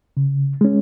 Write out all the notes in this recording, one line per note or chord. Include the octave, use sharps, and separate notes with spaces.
C#3
G#3 C#4